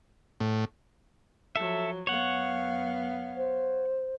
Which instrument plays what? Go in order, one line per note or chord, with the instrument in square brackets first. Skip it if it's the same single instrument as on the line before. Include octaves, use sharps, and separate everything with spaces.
[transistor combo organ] A2
[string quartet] F3 F#3 [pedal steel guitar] A4 E5
[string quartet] F#2 B3 F5 [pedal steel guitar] C#5 F#5
[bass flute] C5